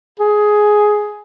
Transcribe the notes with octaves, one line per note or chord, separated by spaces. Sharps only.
G#4